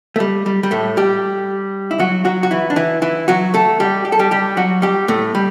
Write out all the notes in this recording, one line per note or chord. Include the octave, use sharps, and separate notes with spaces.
A3
G3
G3
G3
A2 A3
G3 G4
E4
F#3 F#4
F#3 F#4
F#4
E3 E4
D4
E3 E4
E3 E4
F#3 F#4
A3 A4
G3 G4
G4
A4
G3 G4
G3 G4
F#3 F#4
G3 G4
A2 A3
G3